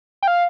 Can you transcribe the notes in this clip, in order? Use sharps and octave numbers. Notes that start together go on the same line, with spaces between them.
G5
F5